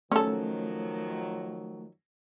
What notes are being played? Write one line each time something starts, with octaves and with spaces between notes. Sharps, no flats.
D#3 F3 F#3 A3 C#4 A4